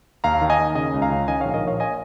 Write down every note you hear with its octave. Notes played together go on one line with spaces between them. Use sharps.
D#2 F5 A#5
D#3
D#5 G#5
D#3
C#3 D#5 G#5
C#2
F5 A#5
C#3
D#3 D#5 G#5
A#1 C#5 F5
A#4 D#5
A#1 C#5 F5
D#5 G#5